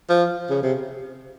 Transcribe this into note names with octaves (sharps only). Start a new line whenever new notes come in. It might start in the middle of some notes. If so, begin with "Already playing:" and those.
F3
C#3
C3